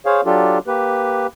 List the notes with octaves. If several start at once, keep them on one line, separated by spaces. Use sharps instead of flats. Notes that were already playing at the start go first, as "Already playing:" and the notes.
G#4 C5 C#5 F5
F#3 D4 F4 G4 A4
A#3 G4 B4